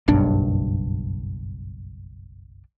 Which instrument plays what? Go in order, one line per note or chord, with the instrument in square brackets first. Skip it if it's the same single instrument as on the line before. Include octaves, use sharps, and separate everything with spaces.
[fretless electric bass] F#1 B1 G2 D4